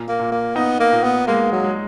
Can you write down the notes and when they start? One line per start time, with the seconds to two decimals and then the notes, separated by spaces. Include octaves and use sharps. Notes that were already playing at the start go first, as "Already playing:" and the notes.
Already playing: A#2
0.09 A#3
0.20 A#2
0.32 A#3
0.56 B3 D#4
0.80 A#3
0.92 A#2
1.04 B3
1.27 G#3 A#3
1.52 F#3
1.64 G#3